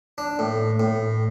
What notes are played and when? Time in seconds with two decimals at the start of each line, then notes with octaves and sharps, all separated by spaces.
0.18 D4
0.39 A2
0.80 A2